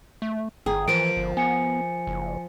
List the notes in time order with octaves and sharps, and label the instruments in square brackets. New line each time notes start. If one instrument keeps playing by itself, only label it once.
[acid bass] A3
[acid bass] G1 [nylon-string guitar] G#4 [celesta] G5 A#5 D#6
[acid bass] E3 [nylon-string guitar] F3 A#4 [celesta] D7
[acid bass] G1
[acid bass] B3 [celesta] G#5 C#7
[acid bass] F#1